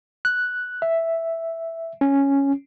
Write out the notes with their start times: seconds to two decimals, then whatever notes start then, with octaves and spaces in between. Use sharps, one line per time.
0.25 F#6
0.82 E5
2.01 C#4